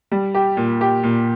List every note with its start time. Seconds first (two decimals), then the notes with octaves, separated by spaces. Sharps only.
0.12 G3
0.34 G4
0.57 A#2
0.81 G4
1.03 A#2